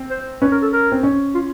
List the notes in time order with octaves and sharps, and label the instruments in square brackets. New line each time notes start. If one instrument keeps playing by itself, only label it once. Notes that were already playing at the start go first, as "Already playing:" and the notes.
Already playing: [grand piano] C4
[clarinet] C5
[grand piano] C#4 [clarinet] B4
[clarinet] A#4
A4
A#4
[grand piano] C4
C#4
[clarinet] F4